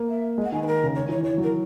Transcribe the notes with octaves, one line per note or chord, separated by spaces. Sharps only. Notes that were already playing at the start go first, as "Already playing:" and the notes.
Already playing: A#3
E5
G#3
F#5
D#3 G#5
B4
A#4
C#3
D#3 C#5
E3 C#5
E3 C#5
F#3
A#4